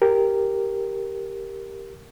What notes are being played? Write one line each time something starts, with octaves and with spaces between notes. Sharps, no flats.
G4 A#4